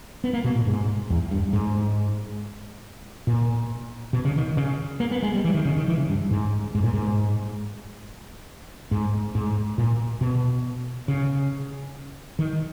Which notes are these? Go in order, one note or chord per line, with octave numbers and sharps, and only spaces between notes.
B3
A#3
B2
A#2
G#2
E2
G2
G#2
A#2
B2
C#3
D#3
C#3
A#3
B3
G#3
G3
E3
D#3
C#3
D#3
E3
C#3
G2
G#2
G#2
A#2
G#2
G#2
G#2
A#2
B2
C#3
D#3